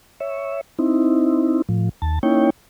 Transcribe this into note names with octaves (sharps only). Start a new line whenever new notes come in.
C#5 E5
C4 D#4 E4
A2 F3
D#2 A5
A#3 C#4 D#4 E4 C#5 G5